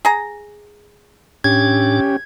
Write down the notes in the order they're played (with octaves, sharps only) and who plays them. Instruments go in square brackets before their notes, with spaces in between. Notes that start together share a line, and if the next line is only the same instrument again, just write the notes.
[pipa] G#4 A#5
[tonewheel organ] A2 D4 [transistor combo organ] C#4 G4 [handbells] G#6